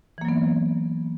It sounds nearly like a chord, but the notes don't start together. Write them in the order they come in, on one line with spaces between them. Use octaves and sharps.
E3 A#3 F#3 B3